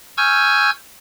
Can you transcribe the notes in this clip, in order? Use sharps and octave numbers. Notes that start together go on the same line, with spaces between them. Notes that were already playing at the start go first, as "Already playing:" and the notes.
G#5 C#6 E6 F6 G6 G#6